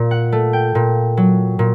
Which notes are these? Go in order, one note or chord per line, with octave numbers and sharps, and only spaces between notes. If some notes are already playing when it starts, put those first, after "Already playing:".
Already playing: A#2
F#5
A3
G5
A#2
F#3
A#2